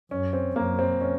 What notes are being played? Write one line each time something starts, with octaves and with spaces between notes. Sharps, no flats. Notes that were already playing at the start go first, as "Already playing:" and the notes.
F#2 C#4
C4
F#2 A#3
C4
C#4